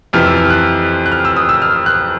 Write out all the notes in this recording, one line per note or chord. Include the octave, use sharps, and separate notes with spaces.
F2 C3 E3 F6
E6
F6
F#6
F#6
F6
E6
D#6
E6
F6
F#6